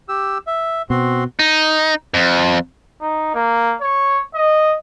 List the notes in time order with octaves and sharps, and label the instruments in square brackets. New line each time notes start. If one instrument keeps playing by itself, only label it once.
[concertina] G4 E6
E5
[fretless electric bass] B2 [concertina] C4 F#4 C6
[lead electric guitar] D#4
F2
[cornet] D#4
A#3
C#5
D#5